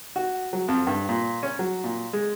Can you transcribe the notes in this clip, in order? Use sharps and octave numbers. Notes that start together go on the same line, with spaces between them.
F#4
F#3
F2
G2
A#2
C#4
F#3
A#2
G#3